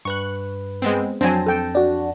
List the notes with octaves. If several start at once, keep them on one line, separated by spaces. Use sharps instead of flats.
G2 B4 C#6 F#6
G#3 B3 C4
F2 F#3 C4 D4 G#5 A5 A#6
A4 G5
D4 F#4